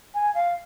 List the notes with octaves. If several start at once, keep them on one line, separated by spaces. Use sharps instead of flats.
G#5
F5